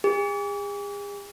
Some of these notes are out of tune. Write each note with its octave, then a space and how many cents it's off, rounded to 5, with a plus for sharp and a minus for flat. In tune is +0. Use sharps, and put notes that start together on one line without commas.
G#4 -40